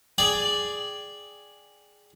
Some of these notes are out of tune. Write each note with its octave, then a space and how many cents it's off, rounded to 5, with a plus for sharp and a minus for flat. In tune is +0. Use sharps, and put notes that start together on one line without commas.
G#4 +0 D5 +0 G5 +0